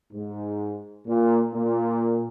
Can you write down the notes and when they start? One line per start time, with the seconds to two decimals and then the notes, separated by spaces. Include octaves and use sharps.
0.13 G#2
1.07 A#2
1.54 A#2